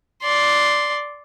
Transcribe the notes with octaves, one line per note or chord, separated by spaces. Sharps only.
D5 C6